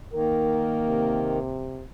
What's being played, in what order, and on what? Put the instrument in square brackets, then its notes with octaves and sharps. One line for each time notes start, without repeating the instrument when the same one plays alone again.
[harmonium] D#3 [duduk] A#3 [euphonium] A#4
[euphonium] C3